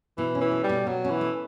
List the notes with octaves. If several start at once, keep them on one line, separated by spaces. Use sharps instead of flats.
B2 E3
C#4
E3
A3
G3
B2
B2 F#3
C#4
E3
A3